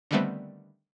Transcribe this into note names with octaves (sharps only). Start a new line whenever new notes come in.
D3 D#3 G3 A3 B3 C4